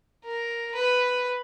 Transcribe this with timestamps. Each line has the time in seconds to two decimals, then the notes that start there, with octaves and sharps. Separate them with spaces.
0.25 A#4
0.74 B4